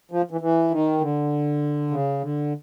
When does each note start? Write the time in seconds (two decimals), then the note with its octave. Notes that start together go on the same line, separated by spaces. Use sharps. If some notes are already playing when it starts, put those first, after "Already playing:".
0.11 F3
0.31 E3
0.41 E3
0.71 D#3
1.01 D3
1.91 C#3
2.21 D3